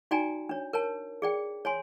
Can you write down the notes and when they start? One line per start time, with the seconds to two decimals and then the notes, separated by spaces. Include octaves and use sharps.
0.11 D#4 F#4 D5 G5 G#5 A#5
0.49 D4 C#5
0.73 A#4 C#5 A5
1.22 G#4 D5 G5
1.65 C#5 G#5 C6